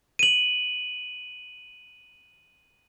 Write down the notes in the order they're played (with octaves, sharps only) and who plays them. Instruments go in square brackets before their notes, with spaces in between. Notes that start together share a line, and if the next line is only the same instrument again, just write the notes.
[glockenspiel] D#7 F#7